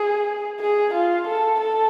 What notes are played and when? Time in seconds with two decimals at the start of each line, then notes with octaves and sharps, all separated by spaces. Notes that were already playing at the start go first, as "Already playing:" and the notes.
Already playing: G#4
0.60 G#4
0.93 F4
1.27 A4
1.59 A4